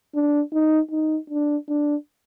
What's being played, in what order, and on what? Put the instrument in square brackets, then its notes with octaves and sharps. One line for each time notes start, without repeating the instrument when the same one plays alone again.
[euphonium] D4
D#4
D#4
D4
D4